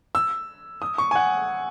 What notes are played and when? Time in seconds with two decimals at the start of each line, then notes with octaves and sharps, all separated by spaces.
0.15 E6
0.82 D#6
0.98 C#6
1.11 G#5
1.15 F#5